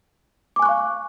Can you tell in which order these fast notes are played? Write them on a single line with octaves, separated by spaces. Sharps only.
D6 G#5 F#6 C#6 F5